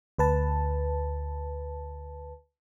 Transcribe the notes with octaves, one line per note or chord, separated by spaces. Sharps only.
D2 B4 A5